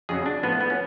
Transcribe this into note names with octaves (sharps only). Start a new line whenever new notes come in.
F2 C#3 F#3 G#4
D4
A2 F3 B3
A3
B3
C#4